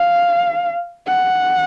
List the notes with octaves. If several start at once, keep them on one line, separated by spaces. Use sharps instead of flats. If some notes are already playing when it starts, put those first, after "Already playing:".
Already playing: F5
F#5